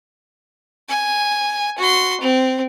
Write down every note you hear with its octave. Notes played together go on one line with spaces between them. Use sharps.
G#5
F#4 C6
C4